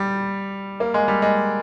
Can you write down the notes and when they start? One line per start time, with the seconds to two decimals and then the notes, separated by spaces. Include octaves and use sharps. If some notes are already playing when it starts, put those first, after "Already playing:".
Already playing: G3
0.80 A#3
0.94 G#3
1.08 G3
1.22 G#3